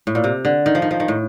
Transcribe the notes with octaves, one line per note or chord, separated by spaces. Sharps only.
A2
A#2
C3
D3
D#3
F3
D#3
F3
D#3
A2